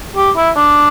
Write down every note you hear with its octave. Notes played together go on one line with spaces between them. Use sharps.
G4
E4
D4